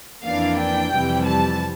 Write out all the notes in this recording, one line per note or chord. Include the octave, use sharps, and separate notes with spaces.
F2 E3 A#3 D4 F5
G5
F2 C3 E3 G3
A5